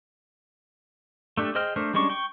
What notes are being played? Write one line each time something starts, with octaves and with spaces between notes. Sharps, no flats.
A3 D4 G4
G#4 C5 D#5 G5 F6
A3 D4 A#4 C5
G3 G#3 C#4 D4 C#6
G5 C#6